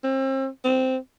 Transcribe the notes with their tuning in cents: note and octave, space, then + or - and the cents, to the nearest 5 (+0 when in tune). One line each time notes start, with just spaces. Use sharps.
C4 +35
C4 -10